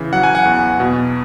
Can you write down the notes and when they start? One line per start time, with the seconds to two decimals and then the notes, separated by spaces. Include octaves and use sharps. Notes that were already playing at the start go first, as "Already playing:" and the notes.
Already playing: C#3 E3
0.13 F#3 F#5
0.23 G#5
0.35 F#5
0.45 E2
0.80 B2